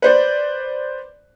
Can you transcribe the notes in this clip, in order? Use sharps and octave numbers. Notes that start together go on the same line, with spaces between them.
B4 C5 D5